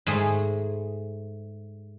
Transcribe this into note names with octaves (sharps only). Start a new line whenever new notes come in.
G#2 A3 G#4